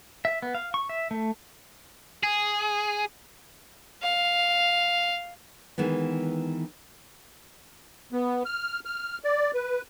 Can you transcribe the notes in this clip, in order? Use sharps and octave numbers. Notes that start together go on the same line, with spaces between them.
E5
B3
F5
C#6
E5
A3
G#4
F5
D#3 E3 G#3 B3
B3
F6
F6
D5
B4